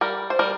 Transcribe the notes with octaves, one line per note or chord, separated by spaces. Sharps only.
G3 A#4
C5
G3 A#4